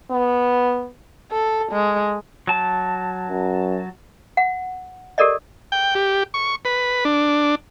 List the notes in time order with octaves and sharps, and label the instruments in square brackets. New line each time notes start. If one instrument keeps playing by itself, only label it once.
[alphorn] B3
[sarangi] A4
G#3
[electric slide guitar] F#3 A5
[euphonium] F#2
[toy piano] F#5
G4 A4 A#4 D5 D#5
[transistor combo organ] G5
G4
C#6
B4
D4